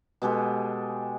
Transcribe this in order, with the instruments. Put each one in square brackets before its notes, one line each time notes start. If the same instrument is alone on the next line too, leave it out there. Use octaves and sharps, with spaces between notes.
[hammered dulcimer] B2 G#3 G4 A4